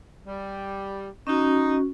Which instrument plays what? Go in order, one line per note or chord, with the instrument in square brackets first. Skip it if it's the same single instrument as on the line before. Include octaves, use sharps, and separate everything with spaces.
[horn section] G3
[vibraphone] C#4 F#4 [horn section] D#4